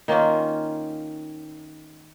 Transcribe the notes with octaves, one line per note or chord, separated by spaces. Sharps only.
D#3 A#3 C#4 F4